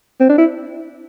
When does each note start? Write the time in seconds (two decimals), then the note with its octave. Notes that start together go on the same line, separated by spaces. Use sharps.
0.20 C4
0.30 D4
0.38 E4